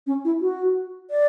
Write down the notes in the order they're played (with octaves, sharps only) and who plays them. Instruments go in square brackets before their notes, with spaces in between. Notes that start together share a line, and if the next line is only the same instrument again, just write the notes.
[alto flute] C#4
E4
F#4
D5